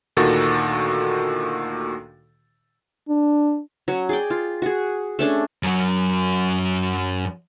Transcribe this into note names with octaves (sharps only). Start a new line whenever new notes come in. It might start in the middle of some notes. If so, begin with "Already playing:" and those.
D2 A#2 D#3 F#4 A4 A6
D4
F#3 C#4
G#4 D5 G5
F4
F#4 G#4
A3 C#4 D4 G#4
F#2 F#3